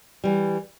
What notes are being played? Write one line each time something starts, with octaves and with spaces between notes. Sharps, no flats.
E3 G3